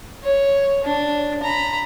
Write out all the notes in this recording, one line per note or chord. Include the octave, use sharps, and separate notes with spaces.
C#5
D4
A#5 B5